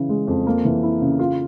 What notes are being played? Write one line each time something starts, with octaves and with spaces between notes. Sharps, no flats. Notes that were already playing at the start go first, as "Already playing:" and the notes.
Already playing: C#3 E3
G#3
F2
A#3
E3
E4
C#3
F4